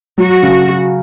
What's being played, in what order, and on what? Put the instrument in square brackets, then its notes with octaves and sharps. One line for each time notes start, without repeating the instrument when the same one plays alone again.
[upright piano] F#3 [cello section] F#4
[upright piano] C#3